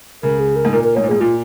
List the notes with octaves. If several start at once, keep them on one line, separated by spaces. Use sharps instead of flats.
C#2 C#3 A#4
G#4
A#4
G#2
A#2 A#4
A#4
G#2 C#5
A#2
G#2 G#4
A#2 F4